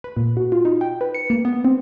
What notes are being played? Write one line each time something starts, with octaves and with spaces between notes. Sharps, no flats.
B4
A#2
F#4
F4
D#4
G5
B4
C#7
A#3
B3
C4